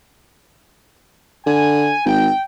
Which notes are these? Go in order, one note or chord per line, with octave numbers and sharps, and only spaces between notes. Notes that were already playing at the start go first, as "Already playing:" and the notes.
D3 G#5
G#1 G5